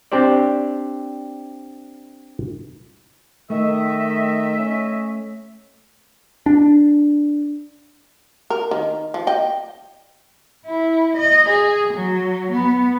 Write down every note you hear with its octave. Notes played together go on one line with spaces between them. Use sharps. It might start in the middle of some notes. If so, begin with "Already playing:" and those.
C4 D4 G4 C5 D5
D#3 A3 D#5 E5
C#4
D4
A#4
D#3
F3
D#5 G5
E4
D#5
G#4
F#3
B3